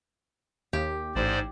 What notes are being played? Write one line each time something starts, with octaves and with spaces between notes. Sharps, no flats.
D#2 G4
A1 G#2 C5 D5